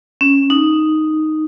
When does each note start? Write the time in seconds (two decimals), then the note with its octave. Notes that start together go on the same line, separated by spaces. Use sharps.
0.21 C#4
0.50 D#4